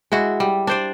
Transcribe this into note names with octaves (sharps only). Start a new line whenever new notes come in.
G#3 E4 F#4
G3
D4 C5 D5